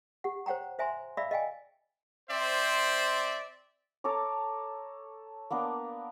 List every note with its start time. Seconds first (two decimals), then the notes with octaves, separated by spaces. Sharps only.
0.24 G4 F#5
0.46 C5 C#5 F#5 G5 A#5
0.79 C5 E5 G#5 A#5 C6
1.17 D5 E5 F5 B5 E6
1.31 D#5 F5 G5 G#5
2.30 C4 C5 D5 E5
4.04 A4 C#5 A#5 D6
5.50 A#3 B3 D4 A#4